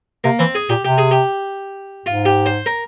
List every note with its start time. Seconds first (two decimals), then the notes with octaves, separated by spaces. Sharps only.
0.24 C3 A#3
0.39 E3 C4
0.55 G#4
0.69 A#2 G4
0.84 C3 G4
0.98 G#4
1.11 G4
2.06 G#2 F4
2.25 G4
2.46 C5
2.66 A#4